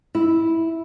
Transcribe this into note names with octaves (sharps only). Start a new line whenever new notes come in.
E4